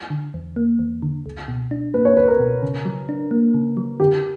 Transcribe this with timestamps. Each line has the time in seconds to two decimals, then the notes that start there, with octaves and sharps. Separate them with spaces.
0.10 D3
0.34 E2
0.56 A#3
0.79 E2
1.02 D3
1.26 C#2
1.48 B2
1.71 D4
1.94 A#3 B4
2.05 C#5
2.17 C#2 B4
2.28 A#4
2.39 B2
2.63 C#3
2.85 F#3
3.09 D4
3.31 A#3
3.54 C#3
3.77 F#3
4.00 D3 G4